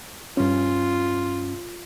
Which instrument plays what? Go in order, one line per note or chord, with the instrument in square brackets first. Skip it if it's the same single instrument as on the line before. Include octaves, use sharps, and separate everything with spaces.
[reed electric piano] G2 C#4 [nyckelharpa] F4